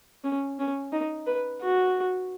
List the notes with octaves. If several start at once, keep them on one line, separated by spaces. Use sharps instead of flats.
C#4
C#4
D#4
B4
F#4